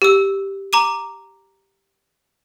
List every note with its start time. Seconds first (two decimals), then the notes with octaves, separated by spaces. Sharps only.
0.02 G4 E6
0.73 A#5 D6 D#7